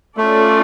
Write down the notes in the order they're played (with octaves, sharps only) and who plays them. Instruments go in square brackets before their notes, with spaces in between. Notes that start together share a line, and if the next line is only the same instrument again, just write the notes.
[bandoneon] A3 [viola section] C#4 F4 A4 D5